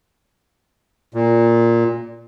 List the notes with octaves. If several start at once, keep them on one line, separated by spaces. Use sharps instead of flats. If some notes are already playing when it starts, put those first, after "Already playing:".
A#2